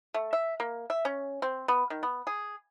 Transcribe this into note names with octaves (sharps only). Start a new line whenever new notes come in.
A3
E5
A#3
E5
C#4
C4
B3
D#3
B3
G#4